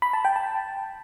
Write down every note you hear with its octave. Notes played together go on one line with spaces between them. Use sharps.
B5
A5
G5
A5